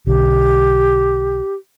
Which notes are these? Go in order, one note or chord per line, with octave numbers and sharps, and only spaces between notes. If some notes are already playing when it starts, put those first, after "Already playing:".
B1 D3 G4